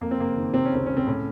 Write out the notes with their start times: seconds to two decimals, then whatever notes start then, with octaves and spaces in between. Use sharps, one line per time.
0.01 F2 A#3
0.11 C4
0.18 F#1 A#3
0.36 D#3
0.53 C3 C4
0.65 C#4
0.72 C#2 C4
0.86 C#2 C#4
0.97 C4
1.07 A2 C#4